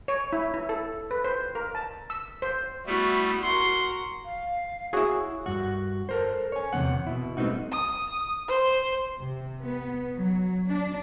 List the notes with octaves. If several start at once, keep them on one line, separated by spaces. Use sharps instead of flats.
C#5
E4
E4
A4
B4
C5
A#4
A5
E6
C5
G3 A3 B3 E4 F#4
F#4 A#4 F#5 C6
F5
E4 F#4 G#4 C#5
G2 F#4
A4 A#4 C5
C#5 G#5
E2 C3 F3 C4 F#5
B2 E4
G3 A3 B3 C4 D#4 F#4
D#6
C5
C3
B3
F#3
D4